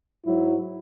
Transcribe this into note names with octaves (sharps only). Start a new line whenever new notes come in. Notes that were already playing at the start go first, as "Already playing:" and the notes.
G#2 F#3 E4